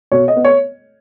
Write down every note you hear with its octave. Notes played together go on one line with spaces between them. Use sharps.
B2 C#5
D#5
B3
C#5